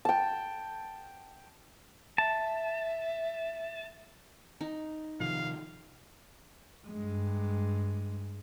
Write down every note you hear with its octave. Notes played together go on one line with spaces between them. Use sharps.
G5 A5
E5 A5
D#4
C3 D#3 F3 F5
G2 G#3